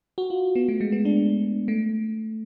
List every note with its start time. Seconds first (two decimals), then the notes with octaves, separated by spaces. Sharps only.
0.18 F#4
0.30 F4
0.55 B3
0.68 A3
0.81 G#3
0.92 B3
1.05 D4
1.68 A3